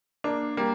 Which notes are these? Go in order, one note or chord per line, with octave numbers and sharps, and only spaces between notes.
A#3 D4
G3 A#3